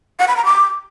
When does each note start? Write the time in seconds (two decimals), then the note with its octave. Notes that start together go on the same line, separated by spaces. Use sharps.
0.19 F#5
0.28 B5
0.36 A#5
0.45 D6